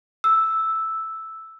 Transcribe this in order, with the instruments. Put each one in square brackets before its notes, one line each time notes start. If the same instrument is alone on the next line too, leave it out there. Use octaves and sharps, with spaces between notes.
[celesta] E6